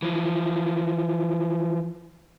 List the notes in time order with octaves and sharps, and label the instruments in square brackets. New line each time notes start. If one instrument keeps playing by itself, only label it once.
[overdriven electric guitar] E3 F3